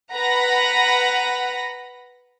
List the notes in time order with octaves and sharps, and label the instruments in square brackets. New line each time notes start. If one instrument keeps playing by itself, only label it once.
[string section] B4 F#5 A#5 B5 A#6